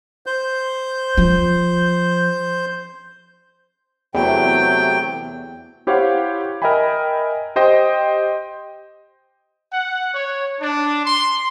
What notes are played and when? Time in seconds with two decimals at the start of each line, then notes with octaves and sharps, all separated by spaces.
0.26 C5 G6
1.17 F3
4.15 E2 C3 F#3 A3 G5
5.87 E4 G4 C5 C#5 F5 F#5
6.62 A#4 D#5 E5 G5 G#5 B5
7.56 G4 C5 D#5 G5
9.72 F#5
10.14 C#5
10.60 D4
11.03 C6